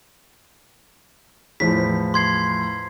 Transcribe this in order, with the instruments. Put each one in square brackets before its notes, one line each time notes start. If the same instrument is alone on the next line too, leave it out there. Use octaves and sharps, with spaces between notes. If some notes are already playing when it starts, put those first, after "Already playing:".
[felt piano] E2 A2 F3 [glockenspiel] B6
[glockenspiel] C6 G#6 C7